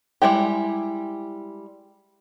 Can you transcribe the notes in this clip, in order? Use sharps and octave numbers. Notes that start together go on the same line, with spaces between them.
G3 G#3 E4 G4